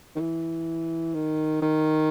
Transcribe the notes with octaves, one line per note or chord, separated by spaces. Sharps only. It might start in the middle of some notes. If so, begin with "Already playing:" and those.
D#3
E3
D#3
D#3